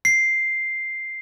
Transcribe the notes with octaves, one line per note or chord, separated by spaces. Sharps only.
C7